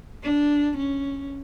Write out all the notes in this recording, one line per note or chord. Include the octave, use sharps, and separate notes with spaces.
D4
C#4